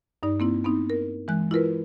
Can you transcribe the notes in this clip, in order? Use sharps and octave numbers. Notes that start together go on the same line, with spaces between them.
G2 D#4 D5
A#3 C4 E4
B3 C4 D#4
A#4
E3 G#3 F#6
E4 F4 A#4 B4